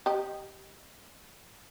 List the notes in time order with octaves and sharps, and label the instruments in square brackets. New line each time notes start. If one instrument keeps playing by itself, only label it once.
[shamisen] G4 D#5